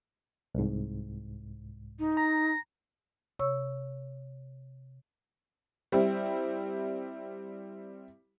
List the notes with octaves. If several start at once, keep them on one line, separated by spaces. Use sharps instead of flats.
C2 G#2
D#4
A#5 A#6
C3 C#5 C#6 E6
G3 C4 E4